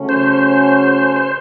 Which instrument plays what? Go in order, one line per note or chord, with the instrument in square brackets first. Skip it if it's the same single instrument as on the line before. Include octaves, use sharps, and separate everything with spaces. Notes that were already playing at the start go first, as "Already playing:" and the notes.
Already playing: [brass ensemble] C#3 F#3 A3 C#4
[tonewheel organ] C5
C5